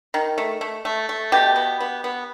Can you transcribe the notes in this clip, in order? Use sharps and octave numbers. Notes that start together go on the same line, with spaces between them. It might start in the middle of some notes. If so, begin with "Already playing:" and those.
D#3
A3
A3
A3
A3
B2 G4
B3
B3
B3